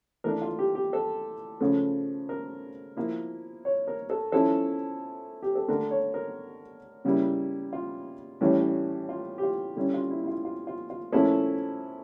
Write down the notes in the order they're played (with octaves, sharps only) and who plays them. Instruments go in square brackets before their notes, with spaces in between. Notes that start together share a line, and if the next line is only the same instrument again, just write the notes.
[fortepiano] E3 A3 D4 A#4
F4
G4
G4
A4
C#3 F3 A3
A#4
F3 A#3 E4
C#5
A#4
A4
F3 C#4 E4 A4
G4
A4
D3 A3 D4 A#4
C#5
A#4
C#3 G3 A#3 E4
F4
A2 E3 G3 C#4
F4
G4
F4
D3 G3 C#4 E4
F4
E4
E4
F4
F4
F4
F4
A#2 F3 A3 C#4 E4 A4